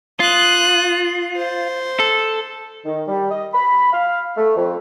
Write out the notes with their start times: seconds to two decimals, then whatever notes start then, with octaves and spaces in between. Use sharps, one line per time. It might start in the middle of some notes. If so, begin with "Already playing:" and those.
0.20 F4 D#6 F#6
1.36 C5
2.00 A4
2.85 D#3
3.07 G3
3.31 D#5
3.54 B5
3.93 F5
4.37 A3
4.56 F2